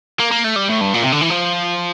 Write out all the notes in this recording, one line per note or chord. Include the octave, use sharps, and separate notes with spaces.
A#3
A#3
A3
G3
A2
G2
A#2
C3
D3
E3
F3